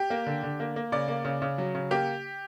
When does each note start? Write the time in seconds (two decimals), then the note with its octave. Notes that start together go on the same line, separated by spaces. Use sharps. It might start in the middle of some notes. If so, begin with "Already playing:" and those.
Already playing: G4
0.10 A#3
0.26 D3
0.43 D3
0.60 A#3
0.76 A#3
0.92 C#3 D5
1.08 A#3
1.24 C#3
1.42 C#3
1.58 F#3
1.75 C#3
1.91 A#3 G4